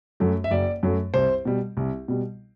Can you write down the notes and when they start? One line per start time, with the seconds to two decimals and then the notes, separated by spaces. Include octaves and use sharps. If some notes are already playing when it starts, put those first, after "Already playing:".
0.20 F#2 F#3 A3
0.44 E5
0.51 F#1 D5
0.83 F#2 F#3 A3
1.14 C2 C5
1.45 B2 G3
1.77 C2
2.08 B2 G3